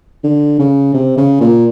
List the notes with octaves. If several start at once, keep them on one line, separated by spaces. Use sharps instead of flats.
D3
C#3
C3
C#3
A#2